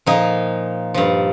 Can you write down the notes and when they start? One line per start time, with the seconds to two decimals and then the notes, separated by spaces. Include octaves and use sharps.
0.06 A#2 F3 D#4
0.94 G2 F3